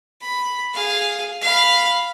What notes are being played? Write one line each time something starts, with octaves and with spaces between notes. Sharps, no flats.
B5
G#4 F5
F5 B5